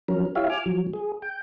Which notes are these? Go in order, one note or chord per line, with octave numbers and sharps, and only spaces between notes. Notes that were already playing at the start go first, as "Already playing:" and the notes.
F3 F#3 C#4 A#4
E4 F4 G4 C#5 E5 F5
G#5 D6 F6
F3 F#3
G#4
G5